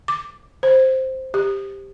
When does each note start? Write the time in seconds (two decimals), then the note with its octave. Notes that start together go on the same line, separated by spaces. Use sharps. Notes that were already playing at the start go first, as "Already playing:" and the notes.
0.08 D6
0.63 C5
1.34 G4